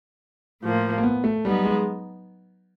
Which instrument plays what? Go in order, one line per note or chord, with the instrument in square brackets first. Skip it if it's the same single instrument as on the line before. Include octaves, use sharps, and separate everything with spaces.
[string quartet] A2 F3 A#3
[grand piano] A#3
B3
A3
[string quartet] F#3 B3 D#4 [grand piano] G3
[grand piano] G#3